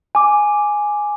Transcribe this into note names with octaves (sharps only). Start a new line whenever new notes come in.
G#5 D6